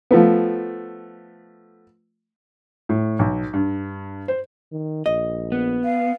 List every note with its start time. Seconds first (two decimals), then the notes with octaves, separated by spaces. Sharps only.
0.11 F3 A3 B3
2.89 A2
3.19 B1
3.53 G2
4.28 C5
4.72 D#3
5.06 A#1 D#5
5.52 B3
5.84 F5